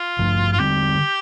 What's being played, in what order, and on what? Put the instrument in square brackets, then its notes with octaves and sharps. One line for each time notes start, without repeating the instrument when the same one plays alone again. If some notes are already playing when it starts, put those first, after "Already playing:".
Already playing: [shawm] F4
[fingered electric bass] G2 F3 A3
[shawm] F4
[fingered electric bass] D3 G3 C4 [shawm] G4